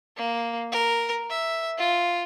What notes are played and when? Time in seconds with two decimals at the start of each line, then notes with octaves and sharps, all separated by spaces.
0.16 A#3
0.72 A#4
1.30 E5
1.78 F4